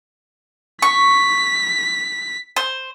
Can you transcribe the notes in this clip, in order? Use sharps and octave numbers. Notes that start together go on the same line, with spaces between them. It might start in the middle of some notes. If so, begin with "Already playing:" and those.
C#6 B6
C5